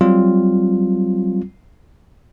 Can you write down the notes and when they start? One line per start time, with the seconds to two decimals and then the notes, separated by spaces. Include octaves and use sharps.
0.01 F#3 G3 C4 F4